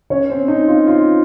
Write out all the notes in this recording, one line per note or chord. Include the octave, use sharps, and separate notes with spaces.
C#4 C#5
C4 C5
D#4
F4
F4